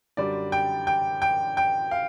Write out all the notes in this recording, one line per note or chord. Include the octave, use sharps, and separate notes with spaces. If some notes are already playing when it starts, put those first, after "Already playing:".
F#2 D3 G3 D5
G5
G5
G5
G5
F5